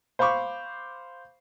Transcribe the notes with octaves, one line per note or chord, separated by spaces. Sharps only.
C5 F5 B5 C#6 D6